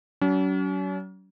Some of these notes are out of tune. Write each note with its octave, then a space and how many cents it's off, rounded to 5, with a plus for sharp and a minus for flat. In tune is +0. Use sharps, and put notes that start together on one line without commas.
F#3 +35 C#4 +40